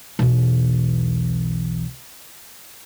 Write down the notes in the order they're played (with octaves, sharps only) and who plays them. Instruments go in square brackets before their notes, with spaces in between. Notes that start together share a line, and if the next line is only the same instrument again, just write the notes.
[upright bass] B1 E2